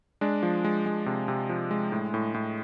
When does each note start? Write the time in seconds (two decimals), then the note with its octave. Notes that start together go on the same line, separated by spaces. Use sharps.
0.21 G#3 D4
0.43 F3
0.64 G#3
0.86 G#3
1.06 C3
1.28 C3
1.49 F3
1.71 G#3
1.92 A2
2.14 A2
2.34 A2